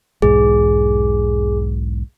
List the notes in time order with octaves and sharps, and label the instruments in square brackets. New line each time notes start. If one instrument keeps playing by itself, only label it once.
[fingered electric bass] B1 E2 G#2 [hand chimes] G#4